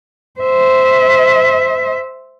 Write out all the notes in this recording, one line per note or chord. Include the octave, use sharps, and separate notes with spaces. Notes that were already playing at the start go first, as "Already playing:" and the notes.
C5 E5